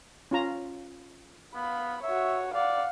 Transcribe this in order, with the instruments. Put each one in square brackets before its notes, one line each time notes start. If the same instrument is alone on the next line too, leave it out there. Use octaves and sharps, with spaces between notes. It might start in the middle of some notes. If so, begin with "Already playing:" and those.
[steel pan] C#4 F4 A#5
[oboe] B3 [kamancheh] F5 B5
[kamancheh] F#4 C#5 [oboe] E5
[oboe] D5 [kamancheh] F5 F#5